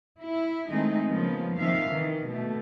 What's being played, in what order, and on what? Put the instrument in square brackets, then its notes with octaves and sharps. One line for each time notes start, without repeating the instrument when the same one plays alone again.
[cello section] E4
D#3 G#3 A3 C4 D#4
C#3 F3 A#3 B3
C3 D#3 F3 E5 F5
D#3 E3
B2 A3